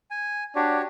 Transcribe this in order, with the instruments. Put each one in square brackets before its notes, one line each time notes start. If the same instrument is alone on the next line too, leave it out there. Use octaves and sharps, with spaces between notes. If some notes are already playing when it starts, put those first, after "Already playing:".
[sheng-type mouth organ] G#5
[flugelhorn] D4 [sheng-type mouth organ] F#4 G4 C#5